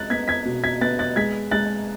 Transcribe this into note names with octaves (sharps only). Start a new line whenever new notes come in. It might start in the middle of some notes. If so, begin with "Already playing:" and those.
Already playing: G#3 F#6 A6
B3 G#6 B6
G#6 B6
B2
G#6 B6
B3 F#6 A6
F#6 A6
G#3 G#6 B6
G#3 F#6 A6